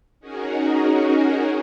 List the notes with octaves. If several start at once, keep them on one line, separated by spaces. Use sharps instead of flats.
C#4 D#4 F#4 G#4 A#4